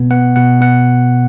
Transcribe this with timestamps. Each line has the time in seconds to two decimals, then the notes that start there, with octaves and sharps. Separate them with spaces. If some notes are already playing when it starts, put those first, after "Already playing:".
Already playing: B2 B3
0.11 B3 F#5
0.36 B2 F#5
0.61 B3 F#5